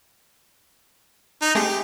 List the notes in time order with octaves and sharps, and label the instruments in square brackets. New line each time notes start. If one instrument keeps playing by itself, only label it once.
[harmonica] D#4
[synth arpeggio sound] G#3 A3 C4 [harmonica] G4